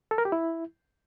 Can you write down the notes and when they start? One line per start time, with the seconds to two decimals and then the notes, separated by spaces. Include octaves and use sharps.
0.11 A4
0.18 A#4
0.25 G4
0.32 E4